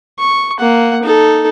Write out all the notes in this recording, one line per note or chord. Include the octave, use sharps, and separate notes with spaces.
C#6
A#3 F#5
D#4 A4